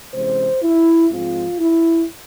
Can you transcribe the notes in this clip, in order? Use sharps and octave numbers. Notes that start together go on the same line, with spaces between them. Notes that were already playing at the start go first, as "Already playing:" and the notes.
C3 E3 G#3 C#4 C5
E4
G#2 F3 G#3 C4 F4
E4